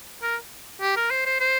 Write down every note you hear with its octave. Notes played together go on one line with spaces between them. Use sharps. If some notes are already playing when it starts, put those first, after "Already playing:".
A#4
G4
A#4
C5
C5
C5